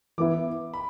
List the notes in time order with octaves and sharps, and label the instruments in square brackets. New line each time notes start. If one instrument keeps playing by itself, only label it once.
[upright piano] E3 B3 E4 [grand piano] D6
[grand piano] B5